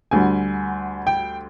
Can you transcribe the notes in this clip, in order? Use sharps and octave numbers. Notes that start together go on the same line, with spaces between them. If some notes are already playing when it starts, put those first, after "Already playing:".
D2 D3 G3 G#5
G5